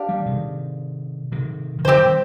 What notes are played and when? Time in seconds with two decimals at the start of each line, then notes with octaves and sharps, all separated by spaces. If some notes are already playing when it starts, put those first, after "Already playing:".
Already playing: D4 G4 D5 F5
0.09 D#3 G3
0.26 C3 D#3
1.32 C3 D#3
1.79 D#3
1.85 D3 F3 C4 G4 C5
1.98 D#3 G3